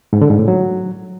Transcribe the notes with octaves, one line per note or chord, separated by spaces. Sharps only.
G#2
D3
G#2
A2
F#3